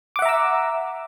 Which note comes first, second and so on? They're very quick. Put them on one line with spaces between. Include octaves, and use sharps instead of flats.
D6 F#5 E5 A#5 E6